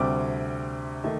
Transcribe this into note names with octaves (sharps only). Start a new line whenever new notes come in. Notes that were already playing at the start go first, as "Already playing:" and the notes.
Already playing: D2 C3 G3 C4 D6
D#3 A3